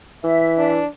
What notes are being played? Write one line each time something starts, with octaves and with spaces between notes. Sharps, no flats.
E3 E5
D4